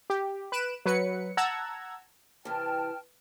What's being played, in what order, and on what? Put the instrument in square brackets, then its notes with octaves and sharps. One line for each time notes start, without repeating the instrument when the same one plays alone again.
[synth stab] G4
B4 F#6 D7 E7
F#3 B4 C#7
F#5 A5 A#5 E6 G#6
[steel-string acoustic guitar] C3 E3 [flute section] G5 A5 F6